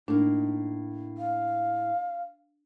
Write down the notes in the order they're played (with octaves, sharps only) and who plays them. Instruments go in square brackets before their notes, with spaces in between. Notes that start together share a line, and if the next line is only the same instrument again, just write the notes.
[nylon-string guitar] A2 A#3 [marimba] D4 [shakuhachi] D#4
[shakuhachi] F5